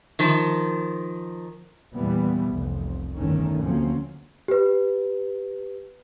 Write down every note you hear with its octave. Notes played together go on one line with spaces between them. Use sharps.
D#3 F3
E2 A#2 E3 G3 B3
F1 C2
G1 E2 D#3 A3 C#4
D2 F3 F#3 A#3 C4 C#4
G4 B4